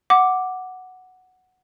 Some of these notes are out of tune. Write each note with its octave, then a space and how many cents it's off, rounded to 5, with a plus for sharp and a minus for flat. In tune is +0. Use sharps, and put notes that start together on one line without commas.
F#5 +0 D6 +0